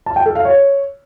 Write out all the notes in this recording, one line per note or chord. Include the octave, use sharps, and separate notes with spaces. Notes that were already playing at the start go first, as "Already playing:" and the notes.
A5
G5
A4
F5
C#5